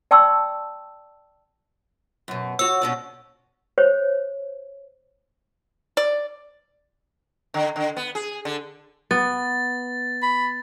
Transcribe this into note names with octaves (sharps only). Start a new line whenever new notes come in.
D5 G5 A5 C6 C#6 E6
F#2 B2
F#4 C#5 E6
B2 C#4 D4
C5 C#5
D5
D3
D3
B3
G#4
D3
B3 A6
B5